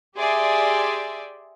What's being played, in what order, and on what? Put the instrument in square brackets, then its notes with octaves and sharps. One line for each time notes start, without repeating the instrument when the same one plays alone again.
[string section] G4 G#4 D5 E5 C6